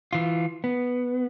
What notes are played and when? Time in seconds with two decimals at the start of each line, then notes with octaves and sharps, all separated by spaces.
0.13 E3 F4
0.64 B3